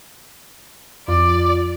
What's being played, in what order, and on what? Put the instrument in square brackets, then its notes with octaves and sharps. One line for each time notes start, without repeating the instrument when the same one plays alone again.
[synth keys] F2 F4 [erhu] D5